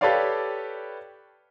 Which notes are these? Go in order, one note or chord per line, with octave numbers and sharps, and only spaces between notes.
G4 A4 B4 C#5 D5 F5